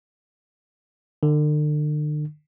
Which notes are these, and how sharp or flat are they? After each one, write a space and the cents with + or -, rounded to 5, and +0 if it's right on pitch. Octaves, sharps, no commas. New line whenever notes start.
D3 +40